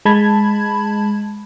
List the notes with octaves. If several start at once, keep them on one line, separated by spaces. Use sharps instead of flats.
G#3 A5 B5 G#6